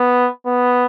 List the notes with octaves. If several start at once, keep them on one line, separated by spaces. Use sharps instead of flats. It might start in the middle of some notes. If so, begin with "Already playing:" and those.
Already playing: B3
B3